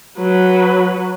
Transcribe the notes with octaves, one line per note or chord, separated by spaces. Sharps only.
F#3 B4